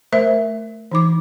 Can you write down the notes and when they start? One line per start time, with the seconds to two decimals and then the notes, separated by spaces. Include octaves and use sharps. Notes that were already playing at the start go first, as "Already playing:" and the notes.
0.12 A3 A#4 C5 E5
0.91 E3 D#4 D6